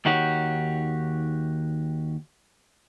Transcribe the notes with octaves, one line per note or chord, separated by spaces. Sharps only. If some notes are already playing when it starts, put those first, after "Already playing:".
D#2 D#3 D#4 F#4 G4 C#5